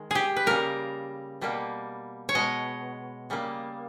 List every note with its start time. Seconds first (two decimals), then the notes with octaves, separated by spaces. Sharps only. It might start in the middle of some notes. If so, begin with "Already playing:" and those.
Already playing: D#3 G#3
0.11 G4 G#4
0.37 B4
0.46 C#3 G3 A#3 A#4
1.41 B2 G3 A#3
2.29 C#5
2.35 B2 G#3 D#5
3.30 C#3 G3 A#3